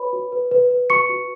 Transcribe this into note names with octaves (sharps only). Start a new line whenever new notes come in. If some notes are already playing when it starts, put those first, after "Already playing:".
Already playing: F#4 B4 C#5 B5
F#4
B4
B4
B4
F#4 C#6 C#7
F#4